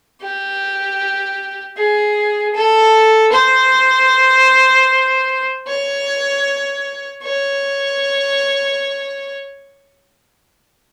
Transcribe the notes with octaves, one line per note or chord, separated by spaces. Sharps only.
G4
G#4
A4
C5
C#5
C#5